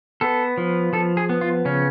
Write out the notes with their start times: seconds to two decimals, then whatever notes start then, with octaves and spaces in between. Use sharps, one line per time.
0.21 B3 A4
0.57 F3
0.93 F3 A4
1.17 G#4
1.29 B3
1.41 F4
1.65 C#3 C#4